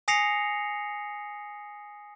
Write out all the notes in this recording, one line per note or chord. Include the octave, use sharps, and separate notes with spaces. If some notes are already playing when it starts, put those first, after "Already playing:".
G#5 D#6 A#6 C7 C#7 F7